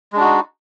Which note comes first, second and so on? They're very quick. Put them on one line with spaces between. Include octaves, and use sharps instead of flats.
G#3 D4 F#4 D#4